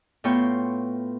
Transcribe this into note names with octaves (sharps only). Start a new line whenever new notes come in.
A2 B3 F4 C#5 G5 C6